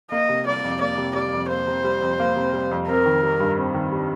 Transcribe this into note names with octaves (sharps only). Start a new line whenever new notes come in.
A#3 D#5
C3
G3 D5
F2
A#3 D5
C3
G3 D5
F2
A#3 C5
C3
G3
F2
A#3
C3
G3
F2
C4 A#4
D#3
G3
G2
C4
D#3
G3